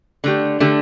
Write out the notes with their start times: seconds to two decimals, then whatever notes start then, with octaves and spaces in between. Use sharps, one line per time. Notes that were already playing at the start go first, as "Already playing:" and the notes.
0.24 D3 A3 G4
0.60 D3 A3 G4